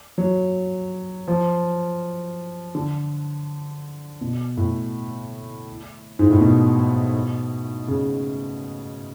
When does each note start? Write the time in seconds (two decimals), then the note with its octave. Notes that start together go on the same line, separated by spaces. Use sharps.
0.18 F#3
1.28 F3
2.75 D3
4.21 B2
4.57 A2
6.19 G#2
6.31 A2
6.41 B2
7.88 C#3